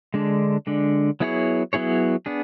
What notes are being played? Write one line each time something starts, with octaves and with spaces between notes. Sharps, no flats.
D3 G#3 D4
D3 G#3 D4
F#3 B3 E4 G#4 C#5
F#3 B3 E4 G#4 C#5
B3 D4 G#4